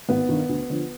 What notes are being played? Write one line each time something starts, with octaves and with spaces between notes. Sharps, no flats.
G#1 B3
G2 D#3
D2
D3 F3